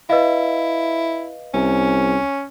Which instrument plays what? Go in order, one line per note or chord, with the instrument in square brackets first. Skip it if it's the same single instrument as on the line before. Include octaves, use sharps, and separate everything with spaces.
[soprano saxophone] E4 [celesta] B4 D#5 F5
[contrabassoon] C2 [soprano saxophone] C#4